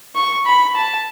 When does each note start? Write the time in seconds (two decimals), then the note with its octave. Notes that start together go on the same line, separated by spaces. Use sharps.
0.16 C#6
0.46 B5
0.75 A5